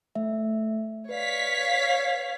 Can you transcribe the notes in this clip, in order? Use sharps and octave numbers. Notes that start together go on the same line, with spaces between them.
A3 E5
B4 C#5 D5 F5 B6